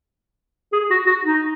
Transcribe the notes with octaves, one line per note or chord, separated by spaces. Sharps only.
G#4
F#4
F#4
D#4